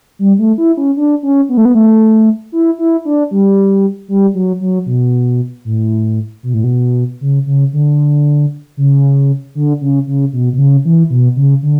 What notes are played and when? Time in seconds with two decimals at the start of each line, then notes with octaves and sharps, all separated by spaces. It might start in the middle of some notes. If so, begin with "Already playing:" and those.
0.19 G3
0.39 A3
0.58 E4
0.77 C#4
0.97 D4
1.23 C#4
1.49 B3
1.57 A3
1.65 B3
1.75 A3
2.52 E4
2.78 E4
3.05 D4
3.31 G3
4.08 G3
4.34 F#3
4.60 F#3
4.86 B2
5.65 A2
6.43 B2
6.54 A2
6.64 B2
7.21 C#3
7.46 C#3
7.73 D3
8.77 C#3
9.55 D3
9.81 C#3
10.07 C#3
10.33 B2
10.53 B2
10.58 C#3
10.85 E3
11.10 B2
11.36 C#3
11.62 D3